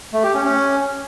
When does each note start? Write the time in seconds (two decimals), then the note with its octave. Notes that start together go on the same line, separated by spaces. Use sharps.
0.13 A3
0.24 G4
0.34 C#4
0.45 C#4